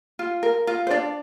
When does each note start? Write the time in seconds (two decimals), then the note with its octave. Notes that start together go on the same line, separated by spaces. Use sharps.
0.19 F4
0.43 A#4
0.67 F4
0.87 C5
0.90 D4 D5